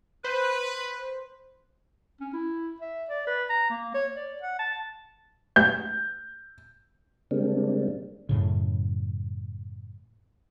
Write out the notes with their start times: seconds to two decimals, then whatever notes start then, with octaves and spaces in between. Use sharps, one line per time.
0.24 B4 C5
2.20 C#4
2.33 E4
2.80 E5
3.09 D5
3.27 B4
3.49 A#5
3.69 A#3
3.94 C#5
4.16 D5
4.42 F#5
4.59 A5
5.56 G6
7.31 C#3 G3 G#3 A#3 C4 D4
8.29 F#2 A2 C#3